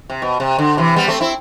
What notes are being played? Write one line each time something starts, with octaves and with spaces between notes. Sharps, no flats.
C3
B2
C3
D3
C3 E3
G3 B3
A3 C4
C4 E4